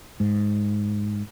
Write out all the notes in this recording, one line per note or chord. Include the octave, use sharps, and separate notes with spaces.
G#2